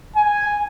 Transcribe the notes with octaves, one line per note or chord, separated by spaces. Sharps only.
G#5